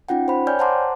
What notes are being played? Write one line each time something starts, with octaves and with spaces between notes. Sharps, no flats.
C#4 D#4 F4 F#5 G5
C5 B5
C#5 D5 G5 G#5 F6 G6
C5 F#5 A5 A#5 C6 D6